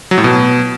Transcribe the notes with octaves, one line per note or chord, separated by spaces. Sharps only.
F#3
A2
B2